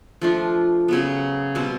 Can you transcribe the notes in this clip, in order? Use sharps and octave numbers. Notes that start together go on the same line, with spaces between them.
F3 A3 D4 F4
C#3 F#3 B3
B2 G3 C4